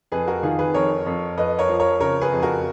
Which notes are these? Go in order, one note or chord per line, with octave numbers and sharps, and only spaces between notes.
F2 G#4 B4
F#4 A#4
D#3 F4 G#4
G#4 B4
F2 A#4 C#5
F2
F2 B4 D#5
A#4 C#5
F3
A#4 C#5
C#3 A#4 C#5
G#4 B4
F2
F#4 A#4